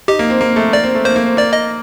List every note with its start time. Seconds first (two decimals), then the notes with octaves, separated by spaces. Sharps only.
0.08 D#4 G4
0.19 A#3
0.30 C4
0.41 A#3
0.56 A3
0.73 A#3 D5
0.83 C4
0.95 A3
1.05 A#3 C5
1.16 A#3
1.26 C4
1.37 A#3 D5
1.53 D#5